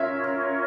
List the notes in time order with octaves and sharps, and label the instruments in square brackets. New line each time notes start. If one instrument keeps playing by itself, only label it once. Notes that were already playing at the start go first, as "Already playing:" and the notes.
Already playing: [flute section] C#4 F4 A#4 C#5 [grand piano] E5